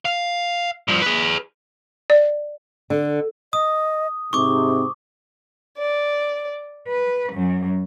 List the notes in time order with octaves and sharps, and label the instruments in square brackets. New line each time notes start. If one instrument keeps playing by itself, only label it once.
[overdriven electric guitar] F5
G2 F3
G#4 B4
[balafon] D5
[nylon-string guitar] D3
[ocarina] D#5 [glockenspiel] D#6
[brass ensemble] G#2 C3 [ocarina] C4 [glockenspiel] C#6 D6
[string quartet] D5
B4
F#2